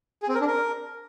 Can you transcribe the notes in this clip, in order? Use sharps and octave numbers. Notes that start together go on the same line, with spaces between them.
G#4
C4
A#4
D4
A#4